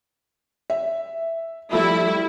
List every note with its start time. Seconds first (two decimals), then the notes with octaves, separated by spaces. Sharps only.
0.70 E5
1.73 F3 G3 A3 E4